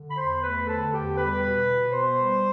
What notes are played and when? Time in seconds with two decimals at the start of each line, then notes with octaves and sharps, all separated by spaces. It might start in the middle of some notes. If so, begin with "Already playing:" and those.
Already playing: D3
0.09 B5
0.17 E2 C5 C6
0.42 A3 B4 B5
0.67 D3 A4 A5
0.92 E2 G4 G5
1.17 G3 B4 B5
1.42 B2
1.67 B2
1.92 B3 C5 C6
2.17 G3